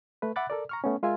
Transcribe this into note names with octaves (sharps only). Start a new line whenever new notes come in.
A3 B4
E5 F#5 B5 D6 F#6 A6
A4 A#4 D5
A#5 C#6 F6
A3 B3 C#4
G#3 F4 A#4 E5 G#5